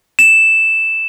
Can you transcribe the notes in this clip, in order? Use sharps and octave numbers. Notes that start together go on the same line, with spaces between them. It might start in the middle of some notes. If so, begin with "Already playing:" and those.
E7